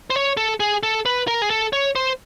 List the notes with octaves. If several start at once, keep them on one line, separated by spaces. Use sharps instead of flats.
C5
C#5
A4
G#4
A4
B4
A#4
G#4
A4
C#5
C5